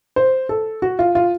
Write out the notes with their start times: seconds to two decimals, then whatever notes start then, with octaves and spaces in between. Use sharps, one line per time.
0.16 C5
0.49 A4
0.82 F#4
0.99 F4
1.15 F4